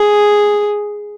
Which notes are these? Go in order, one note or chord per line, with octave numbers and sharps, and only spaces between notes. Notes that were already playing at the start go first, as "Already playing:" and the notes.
Already playing: G#4